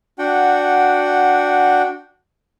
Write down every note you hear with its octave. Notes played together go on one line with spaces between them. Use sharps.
D4 F#4 F#5 G5